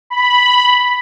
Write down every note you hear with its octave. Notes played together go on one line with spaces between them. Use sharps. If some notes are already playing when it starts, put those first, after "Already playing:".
B5